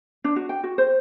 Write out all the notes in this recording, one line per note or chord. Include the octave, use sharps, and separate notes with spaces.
D4
F#4
G5
F#4
C5